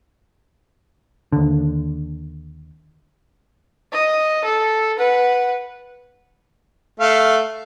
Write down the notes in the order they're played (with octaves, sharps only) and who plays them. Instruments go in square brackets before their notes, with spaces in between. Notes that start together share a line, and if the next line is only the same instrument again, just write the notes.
[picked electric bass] D#2 D3
[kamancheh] D#5
A4
B4 F#5
[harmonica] A3 F5